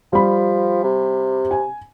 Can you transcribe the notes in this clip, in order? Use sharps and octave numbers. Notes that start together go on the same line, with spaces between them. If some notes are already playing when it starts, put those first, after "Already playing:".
F3 G3 B5
C3
G#5